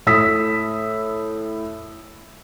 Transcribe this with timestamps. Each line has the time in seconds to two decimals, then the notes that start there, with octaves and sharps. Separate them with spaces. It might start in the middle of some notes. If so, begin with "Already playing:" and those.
0.06 A2 D#6 E6 B6